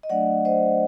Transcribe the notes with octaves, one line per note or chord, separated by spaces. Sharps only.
D#5
F#3 A3 D4 D5 F#5
C5 D#5